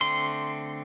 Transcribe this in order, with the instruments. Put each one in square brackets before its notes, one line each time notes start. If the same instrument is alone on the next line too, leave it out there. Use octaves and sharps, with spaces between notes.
[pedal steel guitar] D3 A3 C4 C6